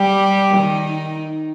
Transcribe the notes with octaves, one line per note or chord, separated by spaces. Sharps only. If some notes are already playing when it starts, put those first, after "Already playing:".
Already playing: G3 G4
D#3 D#4